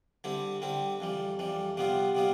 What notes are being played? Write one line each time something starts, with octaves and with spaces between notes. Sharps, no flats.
D3 G3 C4 E4
D3 G3 C4 E4
F2 E3 G3
F2 E3 G3
C3 G3 B3 F4
C3 G3 B3 F4